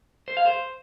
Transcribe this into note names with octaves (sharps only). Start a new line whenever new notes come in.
C5
F5
C5